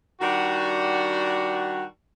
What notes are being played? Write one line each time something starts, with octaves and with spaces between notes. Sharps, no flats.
D#3 G3 D4 F#4